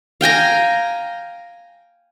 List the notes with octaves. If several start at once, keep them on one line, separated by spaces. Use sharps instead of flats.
F5 G5 G#5 A#5